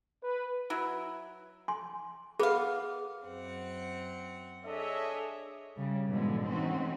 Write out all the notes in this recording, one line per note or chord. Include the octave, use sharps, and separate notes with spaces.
B4
F#3 E4
G#5 C6
B3 G#4 F5
F#2 C4 F#5
D4 G#4 A4 C#5 D#5 E5
C#3 G3
G#2 B2 D3 E3 F3 G#3
E3 A3 C4 C#4 D#4 F#4